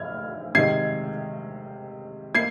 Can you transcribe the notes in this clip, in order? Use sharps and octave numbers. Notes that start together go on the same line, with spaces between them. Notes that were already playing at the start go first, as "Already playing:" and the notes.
Already playing: F6 G#6
C3 D#3 G#3 G#6 C7
A#3 G#6 C7